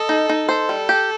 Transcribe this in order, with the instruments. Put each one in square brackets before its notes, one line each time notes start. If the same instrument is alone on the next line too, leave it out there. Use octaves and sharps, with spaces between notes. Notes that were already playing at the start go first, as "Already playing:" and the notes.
Already playing: [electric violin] A4 [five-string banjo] D#5
[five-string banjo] D#4
D#4
[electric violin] A4 [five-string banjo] C5
[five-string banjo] G3
G4